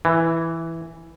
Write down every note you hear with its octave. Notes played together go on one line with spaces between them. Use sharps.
E3